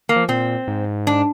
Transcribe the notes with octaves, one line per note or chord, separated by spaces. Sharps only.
A#3
F3
A#2 C4
G#2
D4